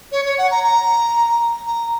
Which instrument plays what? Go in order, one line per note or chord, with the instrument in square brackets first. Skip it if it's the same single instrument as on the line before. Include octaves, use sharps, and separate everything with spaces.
[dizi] C#5
C#5
F#5
A#5
A#5
A#5